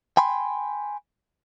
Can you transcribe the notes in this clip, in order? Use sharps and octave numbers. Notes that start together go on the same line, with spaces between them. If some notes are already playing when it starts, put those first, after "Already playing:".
G5 G#5 B5 C6